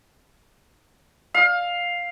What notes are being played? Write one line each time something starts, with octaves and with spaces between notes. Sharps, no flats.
F5